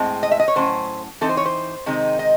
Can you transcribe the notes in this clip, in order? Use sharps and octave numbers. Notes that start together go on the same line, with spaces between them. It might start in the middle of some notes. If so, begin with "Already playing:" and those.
Already playing: A2 G#3 C4
D#5
E5
D#5
C#5
A2 F#3 C#4 C5
E3 C4 D#4 A4
C5
C#5
C5
C3 D#3 G#3 C4 D#4
D#5